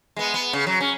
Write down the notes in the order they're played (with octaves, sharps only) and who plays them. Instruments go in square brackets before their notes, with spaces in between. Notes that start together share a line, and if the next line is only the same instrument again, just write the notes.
[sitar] G#3 B3
B3
C#3
F#3
C#4